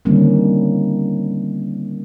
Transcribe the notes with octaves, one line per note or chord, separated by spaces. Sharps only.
D3 D#3 G3 A#3 C4 C#4